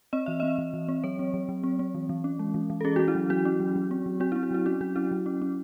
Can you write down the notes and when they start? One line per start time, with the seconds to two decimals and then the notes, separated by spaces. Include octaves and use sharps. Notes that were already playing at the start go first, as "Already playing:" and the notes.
0.13 C4 D#5
0.26 E3 E5
0.40 C4 D#5
0.58 E3
0.74 E3
0.89 C4
1.04 F#3 C#5
1.19 C4
1.34 F#3
1.49 F#3
1.64 C4
1.79 C4
1.95 E3
2.09 E3
2.24 C#4
2.39 G#3
2.54 E3
2.70 E3
2.81 A4
2.85 C#4 G#4
2.96 F#4
2.99 C#4
3.08 E4
3.15 F#3
3.30 F#3 F#4
3.45 C#4
3.60 F#3
3.76 F#3
3.91 C4
4.06 F#3
4.20 C4 F#4
4.32 E4
4.36 C4
4.43 F#4
4.51 F#3 E4
4.66 C#4 F#4
4.81 F#3 F#4
4.96 C#4 E4
5.11 F#3
5.26 C#4
5.42 C#4